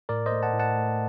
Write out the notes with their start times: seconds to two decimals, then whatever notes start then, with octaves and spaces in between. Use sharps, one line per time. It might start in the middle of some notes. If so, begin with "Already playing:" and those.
0.09 A2 A#4 D5
0.26 C5 D#5
0.32 A3
0.43 F#5 A5
0.54 A2
0.59 F#5 A5
0.76 A3